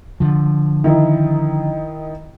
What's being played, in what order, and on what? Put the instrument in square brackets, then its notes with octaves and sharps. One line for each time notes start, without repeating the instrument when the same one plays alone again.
[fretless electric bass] D3 F3
[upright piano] D#3 D#4 E4